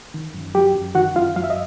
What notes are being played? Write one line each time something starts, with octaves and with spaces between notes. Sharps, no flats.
D#3
F#2
F#3 G4 G5
F#2
D#3 F#4 F#5
F#2 F4 F5
F#3 F5
E5
D#5